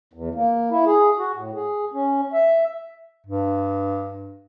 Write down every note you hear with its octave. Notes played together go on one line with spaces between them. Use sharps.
E2
A#3
E4
G#4
F#4
A2
G#4
C#4
E5
G2